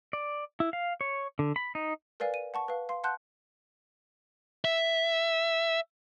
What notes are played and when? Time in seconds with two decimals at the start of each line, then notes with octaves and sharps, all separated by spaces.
0.13 D5
0.60 E4
0.73 F5
1.01 C#5
1.39 D3
1.56 B5
1.75 D#4
2.20 A#4 B4 D5 F5 G#5
2.34 D#7
2.54 F#5 A5 C#6
2.68 B4 F5
2.89 F5 C6
3.04 F#5 A5 C6 F#6 G6
4.65 E5